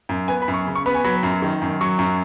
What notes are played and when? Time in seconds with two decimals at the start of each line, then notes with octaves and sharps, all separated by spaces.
0.09 F#2
0.28 B3 G#5
0.42 B5
0.48 F#2
0.54 C#6
0.67 C#3
0.75 C#6
0.86 B3 B5
0.95 G#5
1.04 F#3 B5
1.23 F#2
1.42 D#3
1.62 F#2
1.81 F#3 C#6
1.99 F#2